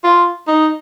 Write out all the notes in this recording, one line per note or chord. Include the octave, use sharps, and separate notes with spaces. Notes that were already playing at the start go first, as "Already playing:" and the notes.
F4
D#4